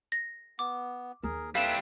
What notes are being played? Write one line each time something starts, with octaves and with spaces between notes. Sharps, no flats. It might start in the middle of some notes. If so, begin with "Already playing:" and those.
A#6
B3 D6
D#2 G#4 A#4
G3 C4 A4 B4 E5 F5 E7